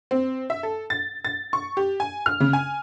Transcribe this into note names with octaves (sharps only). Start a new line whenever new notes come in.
C4
E5
A4
A6
A6
C#6
G4
G#5
F6
C#3
G#5